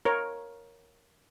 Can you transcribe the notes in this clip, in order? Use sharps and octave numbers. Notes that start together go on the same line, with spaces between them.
A#4 C#5